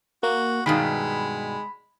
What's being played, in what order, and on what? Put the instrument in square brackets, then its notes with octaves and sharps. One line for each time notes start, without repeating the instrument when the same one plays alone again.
[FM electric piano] A#3 [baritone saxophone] F#4
[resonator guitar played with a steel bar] G2 B2 D#3 [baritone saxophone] G#3 [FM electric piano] B5